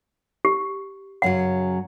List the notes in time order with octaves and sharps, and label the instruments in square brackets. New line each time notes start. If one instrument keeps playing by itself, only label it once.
[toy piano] G4
[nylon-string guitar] F#2 C#3 F#3 [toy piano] F#5